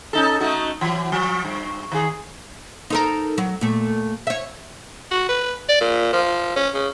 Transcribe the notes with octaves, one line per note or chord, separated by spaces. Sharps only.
C#4 D#4 A4
A3 D#4 F#4
E3 F#3
F3
G2
D#3 G#4
D#4 A4 A#4
F#3
A#2 A3
C#5 E5
F#4
B4
D5
A#2
F3
C#4
C#3